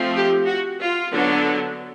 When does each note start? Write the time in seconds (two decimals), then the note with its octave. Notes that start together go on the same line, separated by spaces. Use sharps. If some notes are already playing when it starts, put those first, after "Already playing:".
Already playing: F3 A3 C4
0.15 G4
0.47 F#4
0.79 F4
1.11 D3 F#3 B3